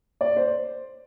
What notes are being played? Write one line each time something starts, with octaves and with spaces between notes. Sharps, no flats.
D5
C5